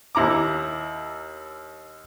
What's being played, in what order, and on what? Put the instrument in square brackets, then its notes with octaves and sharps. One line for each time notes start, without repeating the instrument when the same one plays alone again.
[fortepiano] D#2 E4 A#5 D6